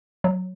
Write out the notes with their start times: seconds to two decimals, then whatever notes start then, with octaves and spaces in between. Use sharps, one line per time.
0.24 F#3